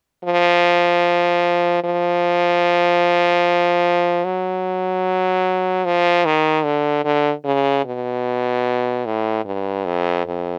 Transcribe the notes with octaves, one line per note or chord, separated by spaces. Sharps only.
F3
F3
F#3
F3
D#3
D3
D3
C#3
B2
A2
G2
F2
F2